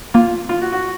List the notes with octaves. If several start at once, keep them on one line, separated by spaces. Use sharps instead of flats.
A#3 F4
F4
F#4
F#4